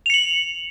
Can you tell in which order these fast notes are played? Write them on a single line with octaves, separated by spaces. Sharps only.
F7 C#7 F#7